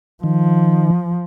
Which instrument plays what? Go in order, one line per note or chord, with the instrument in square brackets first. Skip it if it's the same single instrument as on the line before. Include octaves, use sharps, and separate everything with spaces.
[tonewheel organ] D#3 [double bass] F3